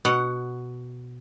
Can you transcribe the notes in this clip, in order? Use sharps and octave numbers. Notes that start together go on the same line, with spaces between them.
B2 F#5